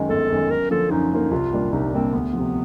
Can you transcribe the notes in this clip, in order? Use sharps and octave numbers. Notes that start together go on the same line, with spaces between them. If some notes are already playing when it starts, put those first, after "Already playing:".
Already playing: F#2 D#3 G#3
G1 A4
F#2 D#3 G#3
F#2 A#4
D3 F3 A#3 A4
F#2 D#4
D3 F3 A#3
C2 F4
A#2 G3 A#3 D4
C2 D#4
A#2 G3 A#3 C4 D4
D2 B3
C3 F3